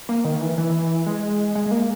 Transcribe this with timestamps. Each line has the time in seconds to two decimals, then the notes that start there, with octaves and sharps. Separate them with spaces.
0.09 A#3
0.24 D#3
0.41 E3
0.58 E3
1.07 G#3
1.55 G#3
1.66 G#3
1.71 A#3